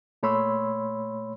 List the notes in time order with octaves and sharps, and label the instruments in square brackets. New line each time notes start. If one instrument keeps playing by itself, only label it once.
[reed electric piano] A#2 A3 C#5 B5 C6 E6